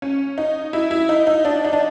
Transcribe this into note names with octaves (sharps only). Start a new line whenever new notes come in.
C#4
D#4
E4
E4
D#4
D#4
D4
D#4
D4